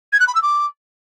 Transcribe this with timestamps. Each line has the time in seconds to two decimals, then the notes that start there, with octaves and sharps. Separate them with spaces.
0.12 G#6
0.20 F#6
0.27 B5
0.35 E6
0.42 D6